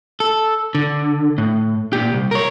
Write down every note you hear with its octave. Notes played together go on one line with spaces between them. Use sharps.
A4
D3
A2
A#2 G4
C2
A#4 C#5